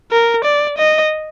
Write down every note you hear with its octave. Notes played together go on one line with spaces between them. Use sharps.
A#4
D5
D#5